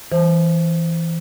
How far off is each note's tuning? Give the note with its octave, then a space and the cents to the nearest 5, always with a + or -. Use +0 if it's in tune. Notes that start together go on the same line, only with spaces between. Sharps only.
E3 +0 C5 +0